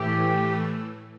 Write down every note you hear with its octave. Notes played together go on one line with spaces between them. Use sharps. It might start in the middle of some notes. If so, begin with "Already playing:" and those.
Already playing: A2 E3 A3 G4